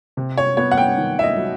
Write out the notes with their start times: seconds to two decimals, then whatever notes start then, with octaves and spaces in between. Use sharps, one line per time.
0.17 C3
0.38 C#5
0.57 B3 C#5
0.71 F#5
0.78 G5
0.97 D#3
1.19 E5
1.23 D#5
1.37 F#3